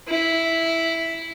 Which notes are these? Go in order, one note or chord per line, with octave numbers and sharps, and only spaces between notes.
E4